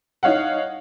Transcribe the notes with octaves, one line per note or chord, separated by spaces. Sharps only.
D#4 C#5 F5 F#5